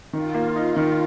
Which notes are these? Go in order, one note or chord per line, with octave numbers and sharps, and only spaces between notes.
D#3 F4
A#3
D#4
D#3